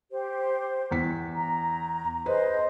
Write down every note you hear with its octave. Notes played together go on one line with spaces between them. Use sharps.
G4 C5
E2 B6
A#5
G#4 B4 C5 D#5